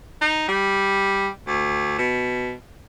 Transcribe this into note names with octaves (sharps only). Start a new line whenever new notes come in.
D#4
G3
D2
B2